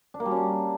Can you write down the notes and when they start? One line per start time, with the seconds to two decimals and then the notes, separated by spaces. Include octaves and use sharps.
0.14 D4
0.20 A#3
0.26 G3
0.31 C#4
0.37 D4